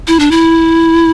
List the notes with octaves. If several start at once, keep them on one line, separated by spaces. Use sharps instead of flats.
E4
D4
E4